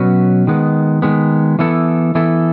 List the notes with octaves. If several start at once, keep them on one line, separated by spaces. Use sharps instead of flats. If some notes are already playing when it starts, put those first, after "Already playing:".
Already playing: B2 F#3 C#4 F#4 B4
D#3 G#3 B3
D#3 G#3 B3
E3 B3 E4 A4
E3 B3 E4 A4